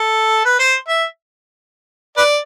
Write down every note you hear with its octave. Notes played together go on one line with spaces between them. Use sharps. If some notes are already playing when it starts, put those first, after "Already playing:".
Already playing: A4
B4
C5
E5
B4 D5